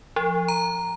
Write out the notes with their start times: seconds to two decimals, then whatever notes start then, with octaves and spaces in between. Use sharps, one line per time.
0.16 F3
0.48 A#5